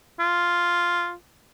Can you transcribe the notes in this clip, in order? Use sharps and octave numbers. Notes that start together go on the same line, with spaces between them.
F4